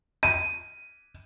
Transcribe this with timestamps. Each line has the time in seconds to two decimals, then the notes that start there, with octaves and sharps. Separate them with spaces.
0.23 D#7